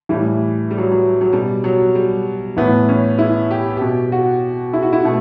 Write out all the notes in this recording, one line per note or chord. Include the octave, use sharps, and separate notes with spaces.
A2 E3 G3
G3
F#3
F#3
F#3
B2 G3
F#3
G3
A2 E3 B3
C#4
E4
G4
B2 G4
F#4
E4
F#4
E4
B2 A3